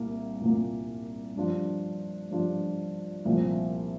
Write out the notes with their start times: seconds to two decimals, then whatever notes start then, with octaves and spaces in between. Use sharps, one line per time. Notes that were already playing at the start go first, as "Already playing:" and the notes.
Already playing: C2 A#2 A#3
0.41 C2 A#2 A#3
1.36 G2 F3 D4 F4
2.31 G2 F3 D4 F4
3.25 C2 A#2 F3